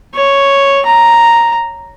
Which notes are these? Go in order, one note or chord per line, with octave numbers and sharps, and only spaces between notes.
C#5
A#5